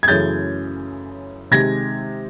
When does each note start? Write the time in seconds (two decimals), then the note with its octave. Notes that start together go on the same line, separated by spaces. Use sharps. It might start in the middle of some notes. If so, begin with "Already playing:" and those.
0.03 G#6
0.08 F#2 C#3 E3 A3 G6 A6
1.51 C3 D#3 G#3 G#6 A#6